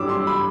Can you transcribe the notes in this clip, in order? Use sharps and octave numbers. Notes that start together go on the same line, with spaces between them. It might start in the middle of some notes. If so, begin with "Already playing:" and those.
Already playing: E3 G3 D4 D6 E6
C6
B5